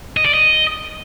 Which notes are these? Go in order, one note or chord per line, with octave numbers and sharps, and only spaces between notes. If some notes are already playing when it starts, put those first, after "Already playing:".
D#5
D5
D#5